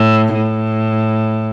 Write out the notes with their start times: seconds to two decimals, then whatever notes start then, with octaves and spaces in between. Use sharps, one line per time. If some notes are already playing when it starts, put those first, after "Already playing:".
Already playing: A2
0.34 A2